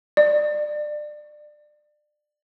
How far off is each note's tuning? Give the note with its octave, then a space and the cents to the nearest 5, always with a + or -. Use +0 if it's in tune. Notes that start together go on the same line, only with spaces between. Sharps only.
D5 +25